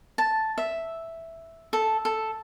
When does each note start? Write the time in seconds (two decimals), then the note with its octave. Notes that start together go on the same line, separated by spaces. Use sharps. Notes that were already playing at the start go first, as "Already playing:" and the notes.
0.18 A5
0.58 E5
1.73 A4
2.05 A4